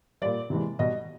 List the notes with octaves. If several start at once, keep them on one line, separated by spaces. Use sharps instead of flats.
A#2 G3 D5
C3 E3 G#3
B2 G3 D#5